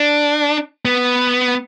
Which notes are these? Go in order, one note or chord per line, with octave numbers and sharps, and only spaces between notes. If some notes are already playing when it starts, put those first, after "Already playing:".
Already playing: D4
B3